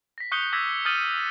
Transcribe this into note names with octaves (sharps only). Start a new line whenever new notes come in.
A#6 B6
C#6 D#6 F#6 G6 C#7 G7
D6 E6 G#6 A#6 B6
D#6 F6 G6 A6 D#7 F#7